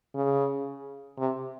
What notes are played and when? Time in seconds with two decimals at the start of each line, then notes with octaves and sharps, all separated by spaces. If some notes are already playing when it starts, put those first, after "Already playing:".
0.15 C#3
1.18 C3